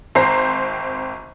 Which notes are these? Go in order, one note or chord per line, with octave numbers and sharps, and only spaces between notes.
G#1 C4 C5 A#5 C7